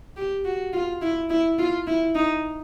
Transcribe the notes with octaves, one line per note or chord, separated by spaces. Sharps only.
G4
F#4
F4
E4
E4
F4
E4
D#4